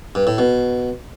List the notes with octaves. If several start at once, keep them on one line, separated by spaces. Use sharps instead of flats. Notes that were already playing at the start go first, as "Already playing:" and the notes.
G2
A2
B2